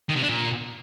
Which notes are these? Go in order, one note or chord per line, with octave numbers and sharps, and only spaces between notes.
D#3
C3
D4
A#2